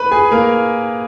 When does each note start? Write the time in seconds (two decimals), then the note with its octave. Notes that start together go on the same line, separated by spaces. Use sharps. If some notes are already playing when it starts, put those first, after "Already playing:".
Already playing: B4 B5
0.11 G#4 G#5
0.32 A#3 A#4